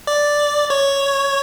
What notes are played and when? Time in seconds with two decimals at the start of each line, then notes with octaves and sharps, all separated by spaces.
0.07 D5
0.70 C#5